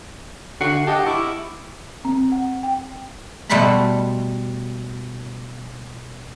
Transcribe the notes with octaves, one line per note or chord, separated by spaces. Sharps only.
D3 F#4 F#5 C7
G4 D#5 F#5 A5
E4 C#6 D6
C4
F#5
G5
B2 G3 A3 C5 A5 B5